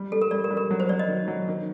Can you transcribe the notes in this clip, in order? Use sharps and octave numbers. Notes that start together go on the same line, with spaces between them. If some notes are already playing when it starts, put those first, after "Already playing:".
Already playing: G3
G3 A4
A#4
G3 D5
A#4
G3
A#4
F#3
C5
F#3 D5
D#5
D#3
F#3
D#3